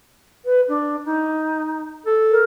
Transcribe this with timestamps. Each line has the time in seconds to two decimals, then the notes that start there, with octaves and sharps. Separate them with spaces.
0.45 B4
0.68 D4
1.05 D#4
2.06 A4
2.31 A#4